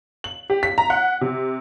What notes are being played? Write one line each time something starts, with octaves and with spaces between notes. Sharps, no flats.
F#7
G4
B6
A#5
F#5
C3